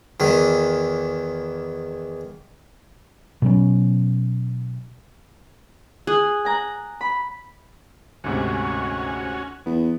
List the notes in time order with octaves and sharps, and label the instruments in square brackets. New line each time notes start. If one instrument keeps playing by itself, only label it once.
[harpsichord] E2 D#3 E3
[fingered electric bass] B2 F#3 C#4
[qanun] G#4 [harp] D#6 F#6
[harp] G#5 A#5 F#6
B5
[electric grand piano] D2 G#2 C3 [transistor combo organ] C#4 F#4
[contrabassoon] E2 [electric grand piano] B3